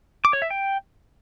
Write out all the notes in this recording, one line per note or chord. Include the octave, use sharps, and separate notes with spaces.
D6
C#5
E5
G5